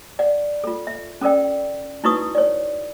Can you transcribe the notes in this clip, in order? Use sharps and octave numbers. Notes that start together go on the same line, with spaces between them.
D5 F#5
F4 A4
E5
C#4 A4 A#4 D5 G5
D#4 E4 F#4 B4 C#6 D#6
C#5 D5